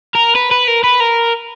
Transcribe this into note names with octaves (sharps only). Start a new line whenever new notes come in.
A#4
B4
B4
A#4
B4
A#4